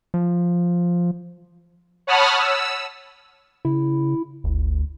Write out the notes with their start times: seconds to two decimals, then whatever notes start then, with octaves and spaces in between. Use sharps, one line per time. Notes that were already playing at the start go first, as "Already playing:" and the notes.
0.14 F3
2.07 C#5 F#5 A5 B5 D#6 F6
2.39 E6
3.65 C#3 E4
4.44 G1 D2